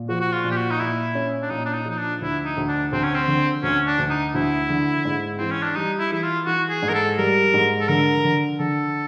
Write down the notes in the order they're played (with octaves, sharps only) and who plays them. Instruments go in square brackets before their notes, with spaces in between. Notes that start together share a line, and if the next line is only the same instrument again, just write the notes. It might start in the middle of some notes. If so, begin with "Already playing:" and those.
Already playing: [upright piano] A#2
[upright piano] F3 [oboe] F#4
[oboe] F#4
F4
[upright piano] A#2
[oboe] G4
F#4
D#4
[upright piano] A#2 [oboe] E4
[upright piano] C#4
[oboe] D4
[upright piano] A#2 [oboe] D#4
[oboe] D4
D#4
[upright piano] F3 [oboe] D#4
[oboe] D4
[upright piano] D2 [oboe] E4
[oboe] D#4
[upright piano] D2
[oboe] D4
[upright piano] D2 [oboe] C4
[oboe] C#4
C4
[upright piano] D3
[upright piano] D2 [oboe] C#4
[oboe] D4
[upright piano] D2
[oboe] D#4
[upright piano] D2 [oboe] E4
[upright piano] D3
G#2
[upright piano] E3 [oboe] C4
[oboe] C#4
D4
[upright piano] G3 [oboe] D#4
[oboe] E4
[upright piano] E3 [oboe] E4
[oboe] F4
[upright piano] E3 [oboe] F#4
[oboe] G#4
[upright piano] G#2
[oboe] A#4
A4
[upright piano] G3 [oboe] A#4
[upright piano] G#2
[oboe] A4
[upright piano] D3 [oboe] A#4
[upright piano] D3
[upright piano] D3 [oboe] A4